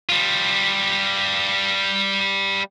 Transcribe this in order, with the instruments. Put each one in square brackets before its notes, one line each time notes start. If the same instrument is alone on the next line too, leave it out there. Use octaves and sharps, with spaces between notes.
[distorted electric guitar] G3 F4